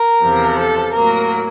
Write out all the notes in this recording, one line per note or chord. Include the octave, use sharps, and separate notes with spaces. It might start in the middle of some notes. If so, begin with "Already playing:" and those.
Already playing: A#4
E2 C3 F3
A4
A2 F#3 A#3 A#4